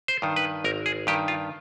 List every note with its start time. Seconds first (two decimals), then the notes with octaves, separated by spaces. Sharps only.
0.08 C5
0.22 G2 D#3
0.36 B4
0.64 G#1 A#4
0.86 G#4
1.07 G2 D#3 G4
1.28 F4